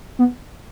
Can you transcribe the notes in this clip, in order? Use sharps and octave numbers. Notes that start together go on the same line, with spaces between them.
B3